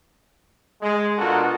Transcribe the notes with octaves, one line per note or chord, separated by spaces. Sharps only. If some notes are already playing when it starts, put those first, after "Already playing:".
G#3
B2 D4 F4 F#4 A4 A#4